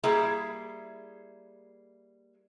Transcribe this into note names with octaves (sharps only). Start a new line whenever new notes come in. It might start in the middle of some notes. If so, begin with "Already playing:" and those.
G3 A#3 E4 G#4 E5